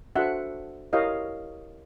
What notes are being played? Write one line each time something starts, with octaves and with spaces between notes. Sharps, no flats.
D4 F#4 A4 C5 E5 F#5
E4 G4 A#4 C#5 D#5 F5